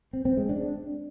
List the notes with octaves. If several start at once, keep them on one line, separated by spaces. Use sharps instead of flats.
C4
C4
G#3
D4